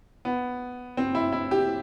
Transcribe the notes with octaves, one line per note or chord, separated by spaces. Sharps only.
B3
C4
E4
E4
G4